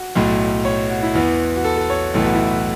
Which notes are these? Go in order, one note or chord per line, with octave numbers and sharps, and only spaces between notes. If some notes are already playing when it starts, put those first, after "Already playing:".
Already playing: F#4
B1 A2 F#3
C#5
F#4
E4
E2 E3 B3
F#4
A4
A4
C#5
B1 A2 E3 B3 A4
F#4
E4
F#4